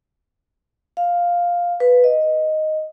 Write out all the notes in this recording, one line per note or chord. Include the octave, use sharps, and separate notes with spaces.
F5
B4
D#5